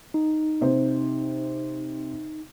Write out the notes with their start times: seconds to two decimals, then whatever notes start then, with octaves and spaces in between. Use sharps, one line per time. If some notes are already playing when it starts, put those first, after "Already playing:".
0.14 D#4
0.61 C3 C5